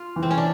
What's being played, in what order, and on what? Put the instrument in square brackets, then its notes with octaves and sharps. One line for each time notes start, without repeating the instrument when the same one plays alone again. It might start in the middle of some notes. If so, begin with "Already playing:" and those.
Already playing: [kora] F4
[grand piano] E3
[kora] C4
C#4
D4